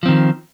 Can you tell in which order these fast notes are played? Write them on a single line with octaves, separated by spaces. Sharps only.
F3 C4 D#3